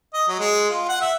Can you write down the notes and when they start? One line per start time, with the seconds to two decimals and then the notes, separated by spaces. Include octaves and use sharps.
0.14 D#5
0.28 F#3
0.39 G#3
0.70 F4
0.89 F#5
1.01 E5